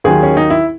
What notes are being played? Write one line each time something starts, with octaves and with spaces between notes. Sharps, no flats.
D#2 D#3 F#3 G#4
C#4
D#4
E4